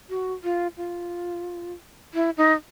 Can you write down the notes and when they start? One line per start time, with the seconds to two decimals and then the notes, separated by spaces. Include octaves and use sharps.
0.10 F#4
0.44 F4
0.77 F4
2.14 E4
2.37 D#4